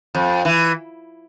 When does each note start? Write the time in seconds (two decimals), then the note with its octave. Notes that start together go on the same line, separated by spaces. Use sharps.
0.15 F2
0.45 E3